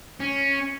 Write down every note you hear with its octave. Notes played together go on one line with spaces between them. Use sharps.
C#4